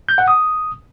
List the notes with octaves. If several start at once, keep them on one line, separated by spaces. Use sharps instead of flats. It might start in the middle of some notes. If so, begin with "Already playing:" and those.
G6
F#5
D#6